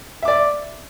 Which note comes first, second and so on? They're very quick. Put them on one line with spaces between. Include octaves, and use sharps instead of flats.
E5 D6 D5